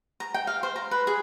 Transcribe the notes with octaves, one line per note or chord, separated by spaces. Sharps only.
A#5
G5
F5
C5
A#5
B4
G#4